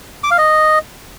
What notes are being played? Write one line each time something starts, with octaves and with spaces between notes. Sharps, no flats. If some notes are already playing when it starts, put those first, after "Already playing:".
D6
F5
D#5